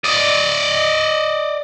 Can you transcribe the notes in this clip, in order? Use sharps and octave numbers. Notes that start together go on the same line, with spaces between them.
D5 D#5